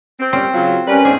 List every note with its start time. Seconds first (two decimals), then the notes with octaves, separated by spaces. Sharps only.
0.20 C4
0.33 A#2 G3 C4 C#4
0.54 C#3 F#3 F4
0.87 G3 C#4 A#4 B4
1.05 E2 G#2 A3 D4 G#4